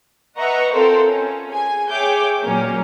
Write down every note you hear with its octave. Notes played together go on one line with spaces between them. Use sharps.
B4 D#5 E5 F#5 A#5 C#6
C4 F4 A4 A#4 C5
C#4
G#4 G#5
G#4 C#5 E5 G5 D6 G6
A#2 F#3 A#3 C#4